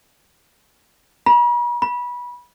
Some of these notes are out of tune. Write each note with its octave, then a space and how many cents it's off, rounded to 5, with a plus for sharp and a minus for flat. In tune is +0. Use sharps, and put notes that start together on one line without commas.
B5 -45
B5 -20